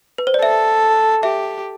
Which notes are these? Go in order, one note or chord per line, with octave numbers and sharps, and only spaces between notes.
B4
C5
D5
A4 E5
G4 E5